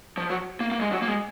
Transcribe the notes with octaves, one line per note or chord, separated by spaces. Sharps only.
F3
F#3
A#3
A#3
G#3
F#3
A#3
G#3